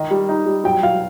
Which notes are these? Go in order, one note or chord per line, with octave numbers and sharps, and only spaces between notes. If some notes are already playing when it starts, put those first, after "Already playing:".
Already playing: D#3 D#5
G3
D#4
G3
F#3 G5
F#3 F5